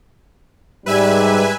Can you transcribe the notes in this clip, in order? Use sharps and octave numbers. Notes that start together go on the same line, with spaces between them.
G#2 G3 B4 E5 G#5